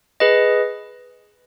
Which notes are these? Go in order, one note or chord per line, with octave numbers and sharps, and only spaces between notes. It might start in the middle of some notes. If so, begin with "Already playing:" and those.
G#4 B4 D#5